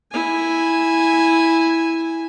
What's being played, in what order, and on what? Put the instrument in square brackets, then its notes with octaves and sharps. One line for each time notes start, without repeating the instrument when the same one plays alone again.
[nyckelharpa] E4 G#5